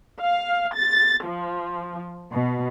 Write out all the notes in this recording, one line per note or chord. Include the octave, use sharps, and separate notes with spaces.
F5
A6
F3
B2